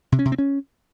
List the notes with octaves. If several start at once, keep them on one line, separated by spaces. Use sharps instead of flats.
C3
C#4
C3
C4
C#4